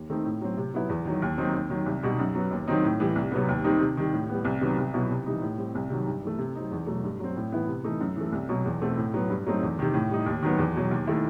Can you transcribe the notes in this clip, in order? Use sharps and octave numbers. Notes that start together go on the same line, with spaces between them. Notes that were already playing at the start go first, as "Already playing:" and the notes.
Already playing: D#2
D#3 A3 C4 D#4
A2
F#3 C4
C3
F#3 B3 E4
E2
D#3 F#3
D#2
D#3 F#3 C4 D#4
D#2
D#3 F#3
C2
B2 G3 D#4
F#2
F#3 B3
D#2
D#3 F#3 C4 D#4
A2
E3 G3
C2
C3 F#3 B3
D#2
D#3 G3 C4 D#4
C3
D#3 G3
A2
G3 B3
C2
C3 D#3 F#3 B3
C2
B2 F#3 B3 E4
C3
E3 G3 D#4
A2
G3 C4
C2
C3 D#3 F#3
G2
E3 A3
C3
F#3 C4 D#4
E2
B2 F#3 A3
G2
F#3 C4
A2
E3 B3 E4
C3
E3 A3 D#4
F#2
E3 A3
C2
B2 F#3
E2
B2 A3 C4
A2
F#3 B3
G2
F#3 A3 C4 D#4
E2
C3 D#3
A2
G3 D#4
D#2
D#3 F#3 B3
E2
B2 F#3
D#2
D#3 A3 E4